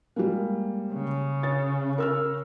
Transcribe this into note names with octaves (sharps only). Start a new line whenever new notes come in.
G3 G#3 A#3
C#3
C#5 A6
A#4 E6 F6